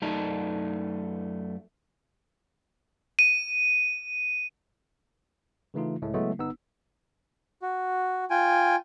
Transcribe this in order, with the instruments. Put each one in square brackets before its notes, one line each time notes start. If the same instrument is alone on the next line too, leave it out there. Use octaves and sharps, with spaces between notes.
[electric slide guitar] F#2 A3 D#4 D5 A5 A#5
[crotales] D#7
[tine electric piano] C#3 E3 A3 D#4 F4
C#2 A2 G#3 A3
C#3 F#3 G#3 A3 B3 E4
G1 B3 D#4 E6
[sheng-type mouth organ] F#4
F4 G5 G#5